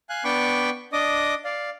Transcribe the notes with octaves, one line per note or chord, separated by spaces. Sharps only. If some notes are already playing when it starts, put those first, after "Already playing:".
F5 G#5 F#6
B3 D4 G5 B5 C#6 D6
D4 D#5 D6 D#6
D5 F5